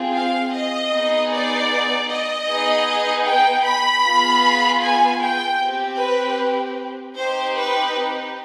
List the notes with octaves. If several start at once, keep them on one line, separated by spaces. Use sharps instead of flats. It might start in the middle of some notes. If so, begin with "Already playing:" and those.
Already playing: C4 F4 G#4
F5
D#5
B3 D#4 G#4
D5
D#5
B3 D#4 G#4
G5
B5
B3 F4 G#4
G#5
G5
C4 G4
B4
C4 D#4 G4 C5
B4